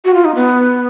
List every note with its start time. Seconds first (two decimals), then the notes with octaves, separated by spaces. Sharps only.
0.05 F#4
0.14 F4
0.25 D#4
0.35 B3